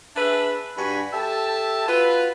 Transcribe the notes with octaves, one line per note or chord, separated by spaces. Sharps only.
D4 G#4 B4 E5
G2 D4 F#4 G#5 B5
G4 A4 E5 A5
F4 F#4 B4